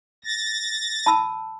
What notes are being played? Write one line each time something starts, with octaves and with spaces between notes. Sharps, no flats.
A6 A#6
A5 B5 E6